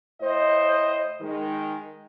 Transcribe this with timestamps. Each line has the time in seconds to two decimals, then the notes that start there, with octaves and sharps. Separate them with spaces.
0.21 A2 C5 D#5
1.20 D#3 G#3